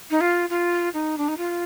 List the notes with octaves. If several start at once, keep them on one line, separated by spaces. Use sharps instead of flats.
D#4
F4
F4
D#4
D4
D#4
F4